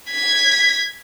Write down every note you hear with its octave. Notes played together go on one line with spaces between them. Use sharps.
G#6 B6